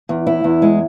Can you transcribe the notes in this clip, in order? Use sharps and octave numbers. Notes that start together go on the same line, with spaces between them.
E2
E4
E2
G#3